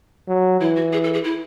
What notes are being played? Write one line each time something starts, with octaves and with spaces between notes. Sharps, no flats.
F#3
E3 E4
F#4
G#4
A4
G#4
E4